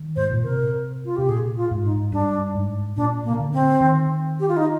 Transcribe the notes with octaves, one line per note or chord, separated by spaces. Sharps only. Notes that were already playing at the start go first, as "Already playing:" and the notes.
Already playing: D#3
G#2 C5
A#2
C3 A#4
F4
C3 G4
A#2 G#4
F4
G#2
D#4
G2 D4
G#2
A#2 D4
A#3
C3
D3
C4
D#3
G4
F4
D#4